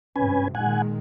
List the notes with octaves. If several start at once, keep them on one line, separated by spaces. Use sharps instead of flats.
G#1 G2 C3 C#4 B4 G#5
A#2 D#3 G#3 F#5 G#5